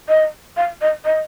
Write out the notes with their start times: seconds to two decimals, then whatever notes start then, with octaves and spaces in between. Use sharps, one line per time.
0.09 D#5
0.57 F5
0.82 D#5
1.05 D#5